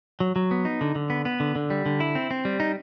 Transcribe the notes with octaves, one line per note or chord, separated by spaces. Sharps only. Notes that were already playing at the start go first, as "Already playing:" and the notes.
F#3
F#3
B3
D#4
D3
D3
B3
B3
D3
D3
G3
D3
E4
C4
C4
G3
D#4